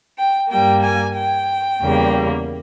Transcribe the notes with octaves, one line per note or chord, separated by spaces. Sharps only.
G5
G2 G3 A#3 G5
G#5
G5
E2 C#3 G3 A#3